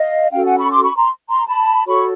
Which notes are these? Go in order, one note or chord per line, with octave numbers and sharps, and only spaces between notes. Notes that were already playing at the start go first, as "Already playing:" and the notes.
Already playing: D#5 F5
C#4 F#4 A4 F5 G5
F#5 G#5
B5 C#6
C6 D6
B5 C#6
A#5 C6
A#5 C6
A5 B5
F#4 A4 C#5 B5 C#6